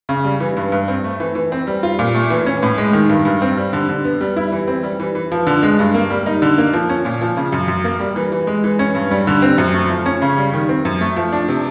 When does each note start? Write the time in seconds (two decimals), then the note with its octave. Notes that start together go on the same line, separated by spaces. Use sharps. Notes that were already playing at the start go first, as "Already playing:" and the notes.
0.09 C#3
0.24 G3
0.40 E3
0.57 G2
0.72 G2
0.88 C4
1.04 A3
1.20 E3
1.35 E3
1.52 C4
1.67 G3
1.83 F4
1.99 A#2
2.14 A3
2.30 E3
2.46 C#4
2.63 A2
2.78 G#3
2.93 D#3
3.10 G2
3.25 G2
3.42 C4
3.57 G3
3.73 D3
3.89 D3
4.04 B3
4.21 G3
4.37 E4
4.52 E3
4.68 C4
4.83 G3
5.00 E3
5.15 E3
5.32 F3
5.47 D3
5.63 G#3
5.79 G2
5.94 A#3
6.10 G3
6.26 D#4
6.42 D3
6.58 A#3
6.73 F3
6.89 C#4
7.05 A#2
7.21 F3
7.37 C#3
7.52 F#2
7.68 F#2
7.84 A#3
8.00 G3
8.16 E3
8.32 E3
8.47 G#3
8.64 E3
8.79 C#4
8.95 G2
9.11 G3
9.27 D3
9.42 C4
9.58 F#2
9.74 A3
9.90 F3
10.06 C#4
10.22 C#3
10.38 G3
10.53 D#3
10.69 C4
10.85 F#2
11.01 A3
11.16 F3
11.33 D4
11.48 C3